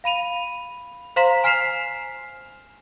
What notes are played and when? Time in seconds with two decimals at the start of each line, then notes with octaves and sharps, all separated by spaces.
0.04 F5 B5 D#7 F7
1.16 C5 F5 A#5 C6 B6 E7
1.44 G#5 F6 B6 C7 E7 F7